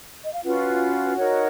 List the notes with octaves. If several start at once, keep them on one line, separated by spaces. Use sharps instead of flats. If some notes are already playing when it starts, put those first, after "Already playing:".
D#5
F5
C#4 F4 F#4 B4 F#5
D#4 A#4 C#5